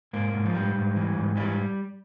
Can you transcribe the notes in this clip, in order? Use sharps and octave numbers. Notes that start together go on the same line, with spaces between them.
G#2 A#3
G#2
F3
G#2 G3
G#2
E3
G#2
E3 G3